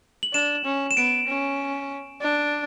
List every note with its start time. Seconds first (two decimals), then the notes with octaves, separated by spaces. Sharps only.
0.23 F#7
0.33 D4 E7
0.65 C#4
0.91 E7
0.97 B3 D7
1.27 C#4
2.22 D4